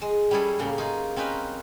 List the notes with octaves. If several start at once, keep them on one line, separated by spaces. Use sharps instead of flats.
G#3
G3 C#4 E4 G#4 A4
A2 C#3 A#3
D#4 F4 G#4
C4 C#4 D#4 A#4 B4